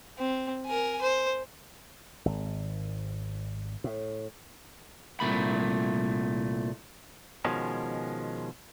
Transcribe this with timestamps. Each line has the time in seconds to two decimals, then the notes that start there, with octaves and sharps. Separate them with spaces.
0.18 C4
0.66 A#4 G#5
1.01 C5
2.25 G#1
3.84 A2
5.20 C2 F2 A#2 A3 B5
7.45 B2 D#3 F3 G#3 C#4